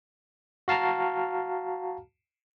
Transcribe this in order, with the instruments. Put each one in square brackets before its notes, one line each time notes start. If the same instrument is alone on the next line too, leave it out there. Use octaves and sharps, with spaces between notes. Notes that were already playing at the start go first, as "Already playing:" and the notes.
[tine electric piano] F#4 F5 A5 A#5 F6